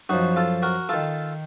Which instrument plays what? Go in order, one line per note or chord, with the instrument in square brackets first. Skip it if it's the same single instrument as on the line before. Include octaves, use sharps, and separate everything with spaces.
[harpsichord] F#2 F3 D#4 F#4
F4 A4
F#4 A#4
D#3 F4 A4